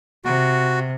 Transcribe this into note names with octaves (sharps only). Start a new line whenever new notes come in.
C3 F#4